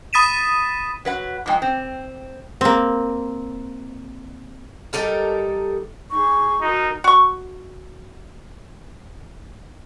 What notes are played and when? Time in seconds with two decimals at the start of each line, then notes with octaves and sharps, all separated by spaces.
0.13 B5 D#6 A6 B6 D#7 E7
1.05 F#3 B4 F#5
1.46 G#2 F3 G5 D6
1.62 C4
2.61 A#3 C4
4.93 G3 D#4 A4 A#4
6.11 D#4 G#4 C#6
6.61 D#4 F#4 A#4
7.04 F#4 C#6